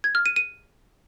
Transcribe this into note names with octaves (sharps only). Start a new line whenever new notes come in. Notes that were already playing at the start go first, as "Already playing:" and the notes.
G#6
F6
D#7
D#7